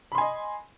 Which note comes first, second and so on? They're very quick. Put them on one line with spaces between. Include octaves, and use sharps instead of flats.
B5 C6 G#5 D#5